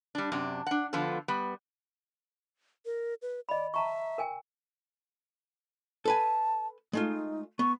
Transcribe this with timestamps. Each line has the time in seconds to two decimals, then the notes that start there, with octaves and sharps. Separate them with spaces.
0.15 G3 D4
0.32 F#2 C3 D4
0.67 D4 F#5
0.93 D3 F3 B3 F4 A4
1.28 G3 B3
2.86 A#4
3.22 B4
3.49 D5 D#5 B5
3.74 E5 A5 A#5 C#6
4.18 A#4 G5 G#5
6.05 A4 B4 G#5 A5
6.93 G#3 A3 D#4 F4
7.59 B3 C#6